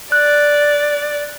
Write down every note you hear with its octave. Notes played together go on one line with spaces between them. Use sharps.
D5 F#6